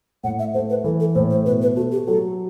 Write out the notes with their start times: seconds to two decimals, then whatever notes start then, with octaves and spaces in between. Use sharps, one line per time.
0.24 A2 F#5
0.39 E5
0.54 A3 C5
0.70 B4
0.84 E3 A4
1.00 A4
1.15 A2 C5
1.30 C5
1.46 B2 B4
1.62 B4
1.76 A3 F#4
1.92 G4
2.07 F#3 A4